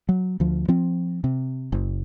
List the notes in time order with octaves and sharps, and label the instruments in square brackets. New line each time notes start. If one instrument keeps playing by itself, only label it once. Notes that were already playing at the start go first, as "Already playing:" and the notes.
[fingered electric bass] F#3
D2 F3
F3 C4
C3
F#1